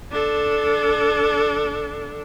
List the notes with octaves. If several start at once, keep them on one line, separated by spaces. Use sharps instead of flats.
D4 A4